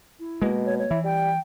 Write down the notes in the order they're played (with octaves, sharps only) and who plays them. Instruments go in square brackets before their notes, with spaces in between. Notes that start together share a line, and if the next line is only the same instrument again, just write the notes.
[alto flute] E4
[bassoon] B2 [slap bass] G#3 A#3
[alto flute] C#5
C#5
[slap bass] E3 [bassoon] E4
[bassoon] G3 [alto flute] G5